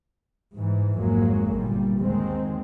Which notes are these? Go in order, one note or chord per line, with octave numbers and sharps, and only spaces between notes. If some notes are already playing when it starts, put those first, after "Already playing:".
G#2 E3
G#1 F2 F#3 G#3 A#3
G1 A#2 G3
D#2 D#3 G#3 C4